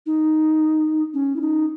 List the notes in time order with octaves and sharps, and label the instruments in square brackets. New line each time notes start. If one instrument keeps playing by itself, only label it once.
[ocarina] D#4
C#4
E4
D#4